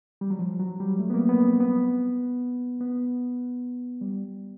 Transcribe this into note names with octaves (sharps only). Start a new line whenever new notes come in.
G3
F#3
F3
F#3
G3
A3
B3
A#3
B3
C4
B3
B3
G3